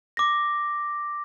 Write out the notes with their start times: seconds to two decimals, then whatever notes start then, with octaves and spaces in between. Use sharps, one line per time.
0.17 D6 A#6